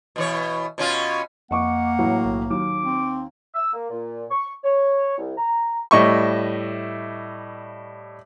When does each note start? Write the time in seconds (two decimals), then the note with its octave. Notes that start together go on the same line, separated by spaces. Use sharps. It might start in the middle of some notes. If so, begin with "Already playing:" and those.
0.16 B2 E3 C#5
0.78 B2 C#4 F4
1.51 F2 A#3 D#5 F#5 C#6 D6
1.98 A1 A2 F#3
2.25 B1
2.50 D#2 F#3 D6
2.85 C4
3.54 E6
3.74 A#3
3.90 A#2
4.30 C#6
4.64 C#5
5.18 C2
5.37 A#5
5.91 A2 G3 D#5 E5 C#6